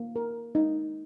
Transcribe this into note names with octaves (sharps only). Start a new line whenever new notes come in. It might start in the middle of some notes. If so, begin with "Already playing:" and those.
Already playing: A#3
A#4
D#4